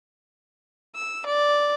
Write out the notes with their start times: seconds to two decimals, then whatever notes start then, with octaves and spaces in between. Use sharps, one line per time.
0.95 E6
1.26 D5